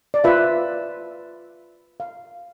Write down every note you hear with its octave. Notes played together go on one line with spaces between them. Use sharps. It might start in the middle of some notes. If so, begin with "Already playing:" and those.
D5
F4 B4 E5
F5